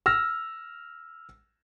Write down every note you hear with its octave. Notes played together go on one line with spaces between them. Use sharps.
E6 F6 A#6